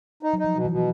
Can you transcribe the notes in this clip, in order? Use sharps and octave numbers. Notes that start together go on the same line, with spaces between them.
D#4
F#3
D#4
F3
B2
E3
B2
E3